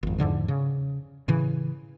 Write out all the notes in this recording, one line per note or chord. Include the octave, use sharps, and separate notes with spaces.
G#1 F2
E2 G#2 D3 F3
C#3
A2 C#3 E3